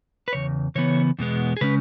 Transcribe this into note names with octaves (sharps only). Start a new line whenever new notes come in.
B4
E2 C#3 C#5
C#3 E3 B3 C#5
E2 B2 G#3 B3
G#4
C#3 G#3 C#4 B4